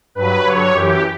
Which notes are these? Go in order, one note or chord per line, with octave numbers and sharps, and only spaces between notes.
G2 F#3 B4
G2 D3 F#3 C#5
F#2 E3 G4